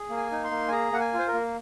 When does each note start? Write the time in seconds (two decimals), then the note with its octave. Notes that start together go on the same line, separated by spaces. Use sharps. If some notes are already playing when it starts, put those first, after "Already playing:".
Already playing: G#4
0.10 A#3
0.17 G#5
0.31 D#4
0.44 C6
0.51 A#3
0.68 G#5
0.72 G#4 A#5
0.92 A#3 F#5
1.00 G#5
1.13 F4
1.19 C5
1.28 A#4
1.34 A#3